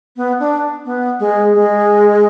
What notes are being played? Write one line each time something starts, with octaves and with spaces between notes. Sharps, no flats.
B3
D4
B3
G#3
G#3